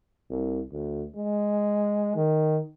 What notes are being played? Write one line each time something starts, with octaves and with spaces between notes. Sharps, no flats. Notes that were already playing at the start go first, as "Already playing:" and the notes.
C2
D2
G#3
D#3